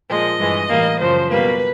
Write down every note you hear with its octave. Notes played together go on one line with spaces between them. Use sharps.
A#2 F3 G#3 D#5
G2 E3 G#3
A2 E3 G3 A#3
F#2 C#3 F3 C5
B2 G3 A#3 B4